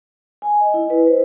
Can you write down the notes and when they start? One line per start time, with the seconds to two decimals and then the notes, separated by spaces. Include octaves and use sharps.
0.42 G#5
0.61 D#5
0.74 E4
0.90 B4
1.07 C5